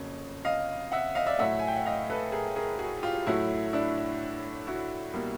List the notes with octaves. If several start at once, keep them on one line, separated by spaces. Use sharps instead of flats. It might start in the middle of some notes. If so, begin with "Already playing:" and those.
Already playing: F2 C#3 F#3 A#3 C#5
D#5 F5
E5 F#5
D#5 F5
D5 E5
A2 F#3 A3 E5 F#5
G#5
G5
F#5
D#5 F5
A4 B4
G#4 A#4
G#4 A#4
F#4 G#4
F4 G4
A2 F#3 A3 E4 F#4
D4 E4
E4 F#4
B2 G3 A#3